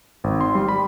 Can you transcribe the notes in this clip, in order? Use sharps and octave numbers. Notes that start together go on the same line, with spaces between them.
G#1
C6
G3
B5